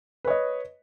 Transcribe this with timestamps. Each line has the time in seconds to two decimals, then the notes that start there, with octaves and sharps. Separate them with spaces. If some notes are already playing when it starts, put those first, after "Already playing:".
0.24 B4
0.27 C#5
0.30 D#5